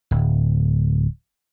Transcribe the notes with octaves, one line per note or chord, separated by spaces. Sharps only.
D1